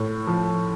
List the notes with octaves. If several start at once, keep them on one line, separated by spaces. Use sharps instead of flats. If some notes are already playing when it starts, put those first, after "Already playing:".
Already playing: A2
F3